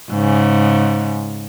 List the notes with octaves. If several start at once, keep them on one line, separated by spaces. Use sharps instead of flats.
G#2 C#3